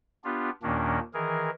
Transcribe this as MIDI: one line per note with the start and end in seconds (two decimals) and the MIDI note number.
0.24 0.50 59
0.24 0.50 62
0.24 0.50 65
0.24 0.50 67
0.63 0.99 39
0.63 0.99 46
0.63 0.99 51
0.63 0.99 58
0.63 0.99 61
0.63 0.99 62
1.14 1.50 51
1.14 1.50 52
1.14 1.50 68
1.14 1.50 70